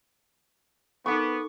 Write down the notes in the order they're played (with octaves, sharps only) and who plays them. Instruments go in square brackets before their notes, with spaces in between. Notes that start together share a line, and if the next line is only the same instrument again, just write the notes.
[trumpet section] B3 [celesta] D#4 A4 [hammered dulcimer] C#6 D6